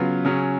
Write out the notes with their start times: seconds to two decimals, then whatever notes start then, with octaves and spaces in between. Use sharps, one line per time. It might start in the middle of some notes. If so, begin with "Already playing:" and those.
Already playing: C#3 F#3 B3 F4
0.25 C#3 F#3 C#4